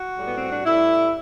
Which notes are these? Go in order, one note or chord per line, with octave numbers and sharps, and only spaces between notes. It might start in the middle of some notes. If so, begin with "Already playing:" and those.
Already playing: F#4
A2 G3
B3
C4
D4
A2 G3 E4